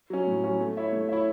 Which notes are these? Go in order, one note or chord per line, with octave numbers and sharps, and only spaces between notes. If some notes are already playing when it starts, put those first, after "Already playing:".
F#3 C#4
A2
F#3 C#4
A3
E4 C#5 E5
A3
E4 C#5 E5